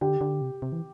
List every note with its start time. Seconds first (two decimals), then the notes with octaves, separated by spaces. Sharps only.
0.01 D3 G4
0.21 D3
0.41 C3
0.62 C3
0.72 E3